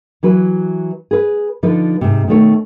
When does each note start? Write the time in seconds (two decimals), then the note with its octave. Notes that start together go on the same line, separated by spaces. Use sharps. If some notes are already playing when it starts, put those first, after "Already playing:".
0.23 E3 F#3 B4
1.11 G#4 B4
1.63 D3 F3 D#4 B4
2.01 G#2 C3
2.27 B2 D#3 A3 C#5